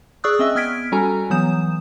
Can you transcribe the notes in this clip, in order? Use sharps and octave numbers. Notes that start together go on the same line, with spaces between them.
G#4 D5 C#6 D#6 E6 F#6
C4 C#4 D#5 E5 E6
B3 F6 G#6 B6 D7
G3 C#4 F#4 A4 G#5 A#5
E3 F#3 B3 D#6 G6 E7